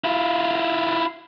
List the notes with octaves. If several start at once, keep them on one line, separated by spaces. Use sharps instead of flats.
E4 F4